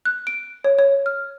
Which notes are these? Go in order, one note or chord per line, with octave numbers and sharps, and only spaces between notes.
F#6
D7
C#5
C#5
F6